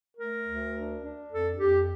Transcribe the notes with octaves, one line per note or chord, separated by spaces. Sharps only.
A3 A#4
D2
D4
D4
F2 A4
F2 G4